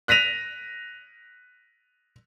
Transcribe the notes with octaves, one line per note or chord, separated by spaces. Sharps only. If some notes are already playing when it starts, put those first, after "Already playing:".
F#6 A#6 B6 D#7 F7